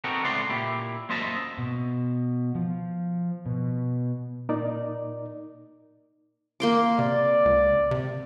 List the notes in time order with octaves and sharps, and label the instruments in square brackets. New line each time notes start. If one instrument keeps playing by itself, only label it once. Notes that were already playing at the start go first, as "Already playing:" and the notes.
[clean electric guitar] B3 C4 D#4 F#4 A4 A#4
C#2 A2 B3 D5 C6
A#2 E4 G4
F#2 A#3 C5 D#5 E5 A5
[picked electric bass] B2
F3
B2
[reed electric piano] A#2 D#4 A#4 D5
[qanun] A#3 C6 D6
[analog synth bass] C3 [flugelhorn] D5
[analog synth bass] C#2
C3